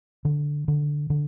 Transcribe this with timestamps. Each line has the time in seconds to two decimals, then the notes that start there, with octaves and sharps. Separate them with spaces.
0.25 D3
0.68 D3
1.10 D3